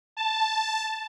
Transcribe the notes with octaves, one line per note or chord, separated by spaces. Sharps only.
A5